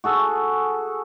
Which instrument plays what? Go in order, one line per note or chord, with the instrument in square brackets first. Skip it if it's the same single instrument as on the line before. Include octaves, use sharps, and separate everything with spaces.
[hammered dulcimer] F#4 G#4 A4